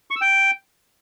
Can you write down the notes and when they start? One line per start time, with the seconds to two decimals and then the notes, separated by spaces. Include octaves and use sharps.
0.11 C#6
0.16 E6
0.21 G5